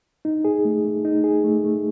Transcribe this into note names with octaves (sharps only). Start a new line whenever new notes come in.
D#4
G#4
A3
A3
D#4
G#4
A3
A3